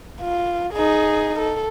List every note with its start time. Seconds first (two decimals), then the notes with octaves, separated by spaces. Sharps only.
0.21 F4
0.73 D#4 G#4
1.39 A4